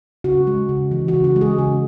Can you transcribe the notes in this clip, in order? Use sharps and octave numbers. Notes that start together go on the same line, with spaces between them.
C#3 F#4
G#3
C#3
E3
F#4
C#3
F#4
G#3
G#4
C#3 G#4